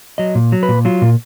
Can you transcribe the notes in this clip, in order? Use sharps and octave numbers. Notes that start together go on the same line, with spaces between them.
F#3 D#5
A#2
F#3
B4
A#2
F#3 F4
A#2